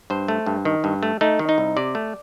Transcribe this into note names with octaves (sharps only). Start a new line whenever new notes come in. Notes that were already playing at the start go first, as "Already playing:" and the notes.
G2 C5
A3
G2
D#3
G2
A3
A3 D#4
D#3
D#4
C2
C3 D5
A3